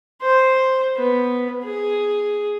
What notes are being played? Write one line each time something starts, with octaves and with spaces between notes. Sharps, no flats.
C5
B3
G#4